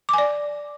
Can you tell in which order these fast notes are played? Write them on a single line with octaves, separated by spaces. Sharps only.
D6 G#5 D5